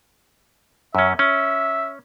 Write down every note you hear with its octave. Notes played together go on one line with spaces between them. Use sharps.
F#2 C#4 E5
C#4 E5